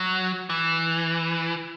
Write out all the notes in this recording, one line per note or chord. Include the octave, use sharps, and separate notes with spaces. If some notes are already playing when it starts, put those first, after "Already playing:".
Already playing: F#3
E3